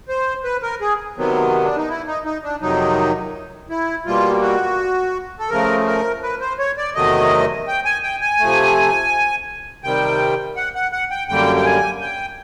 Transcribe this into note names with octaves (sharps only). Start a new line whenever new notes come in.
C5
B4
A#4
G#4
C3 D#3 F#3 B3
D4
D#4
E4
D#4
D#4
D4
F2 C3 D#3 F#3 D#4
E4
B2 G3 A#3 F4
F#4
A4
C#3 F3 A3 A#4
A#4
B4
C5
C#5
D5
E2 C3 D#3 F#3 A3 D#5
G5
G#5
G5
G#5
C3 F3 A3
C3 D#3 G3 G5
F#5
F#5
F#5
G5
F#2 D3 G3 A#3 G5
G5
G#5
G5